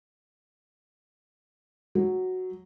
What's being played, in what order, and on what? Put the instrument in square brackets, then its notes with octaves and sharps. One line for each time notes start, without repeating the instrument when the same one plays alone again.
[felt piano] F#3